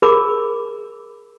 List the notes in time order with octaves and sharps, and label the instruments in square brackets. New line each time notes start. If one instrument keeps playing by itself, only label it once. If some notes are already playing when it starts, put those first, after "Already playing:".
[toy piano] G#4 A#4 B5 D6